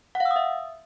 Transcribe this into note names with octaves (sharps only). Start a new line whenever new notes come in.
F#5
F5
E6
D#6
E5